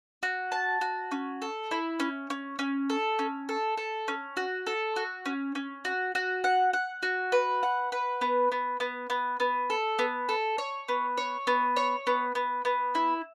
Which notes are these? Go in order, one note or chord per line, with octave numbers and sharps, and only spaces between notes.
F#4
A5
F#4
C#4
A4
E4
C#4
C#4
C#4
A4
C#4
A4
A4
C#4
F#4
A4
F#4
C#4
C#4
F#4
F#4
F#5
F#5
F#4
B4
F#5
B4
B3
B3
B3
B3
B3
A4
B3
A4
C#5
B3
C#5
B3
C#5
B3
B3
B3
E4